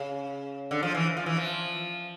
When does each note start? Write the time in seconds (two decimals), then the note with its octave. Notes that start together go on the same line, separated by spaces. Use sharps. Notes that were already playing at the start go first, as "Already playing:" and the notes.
Already playing: C#3
0.71 D3
0.83 F3
0.95 E3
1.17 F3
1.26 E3
1.37 F3